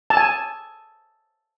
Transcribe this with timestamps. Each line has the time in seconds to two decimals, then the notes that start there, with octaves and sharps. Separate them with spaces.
0.10 A5
0.17 G#5